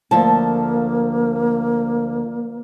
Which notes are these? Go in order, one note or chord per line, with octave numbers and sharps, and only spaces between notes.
D2 F3 A#3 A5